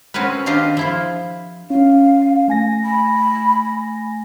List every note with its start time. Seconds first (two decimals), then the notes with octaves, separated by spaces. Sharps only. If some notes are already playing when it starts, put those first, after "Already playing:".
0.14 C4 C#4 F#4 A#4 B4
0.46 D#3 C4 D4 F4 G4 D#5
0.77 F3 E4 F4
1.70 C#4 F5
2.48 A3 G#5 A#6
2.84 B5